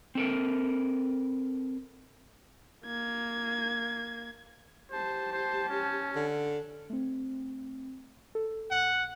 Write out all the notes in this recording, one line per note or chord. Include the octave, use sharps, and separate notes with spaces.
C4 A4 A#4
A#3 G#6
G4 C5 A5
C5
C#4
D3
A3 C4
A4
A#1 F#5